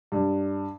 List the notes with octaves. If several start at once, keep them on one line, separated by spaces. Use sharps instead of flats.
G2